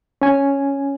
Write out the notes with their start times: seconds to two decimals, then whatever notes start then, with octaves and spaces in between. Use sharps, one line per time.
0.22 C#4 G#5